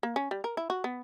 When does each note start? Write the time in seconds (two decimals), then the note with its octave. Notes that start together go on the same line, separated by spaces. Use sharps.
0.03 A#3
0.16 C#4
0.31 G3
0.44 A#4
0.57 E4
0.70 F#4
0.84 B3